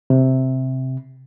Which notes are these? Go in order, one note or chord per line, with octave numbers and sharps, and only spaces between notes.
C3